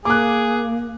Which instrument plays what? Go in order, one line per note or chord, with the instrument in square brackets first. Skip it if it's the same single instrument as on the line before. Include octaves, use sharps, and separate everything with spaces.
[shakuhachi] A#3 [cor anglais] G#4 [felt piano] D6 F#6